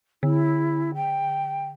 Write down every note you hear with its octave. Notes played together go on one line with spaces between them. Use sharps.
D3 E4
G5